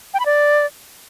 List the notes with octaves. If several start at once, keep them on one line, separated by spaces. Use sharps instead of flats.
G5
B5
D5